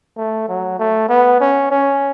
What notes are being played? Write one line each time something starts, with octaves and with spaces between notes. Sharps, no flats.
A3
F#3
A3
B3
C#4
C#4